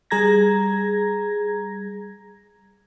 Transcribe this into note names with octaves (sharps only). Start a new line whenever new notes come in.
G3 G#4 A#5 G#6 A#6